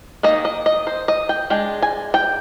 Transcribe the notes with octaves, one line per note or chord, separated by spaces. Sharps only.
D#3 A#3 D#5
D#5
D#5
C5
D#5
G5
G#3 D4 G5
G#5
G5